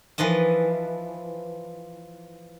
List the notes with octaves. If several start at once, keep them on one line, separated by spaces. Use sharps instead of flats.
E3 F3 B4 D#5 A5